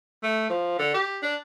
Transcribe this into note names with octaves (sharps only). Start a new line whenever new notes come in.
A3
F3
D3
G4
D4